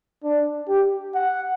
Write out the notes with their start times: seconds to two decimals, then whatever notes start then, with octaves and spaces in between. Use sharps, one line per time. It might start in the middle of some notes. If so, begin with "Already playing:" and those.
0.24 D4
0.68 G4
1.14 F#5